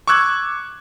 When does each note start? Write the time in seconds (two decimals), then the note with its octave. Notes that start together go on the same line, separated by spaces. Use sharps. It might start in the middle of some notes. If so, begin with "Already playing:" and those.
0.08 C#6 D6 E6 F#6 G#6